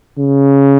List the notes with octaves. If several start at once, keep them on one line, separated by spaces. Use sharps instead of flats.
C#3